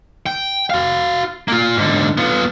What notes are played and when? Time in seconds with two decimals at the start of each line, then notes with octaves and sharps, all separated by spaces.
0.26 G5
0.70 F#4 F5
1.48 A#3 F4
1.77 G#2 D3
2.17 B3 F4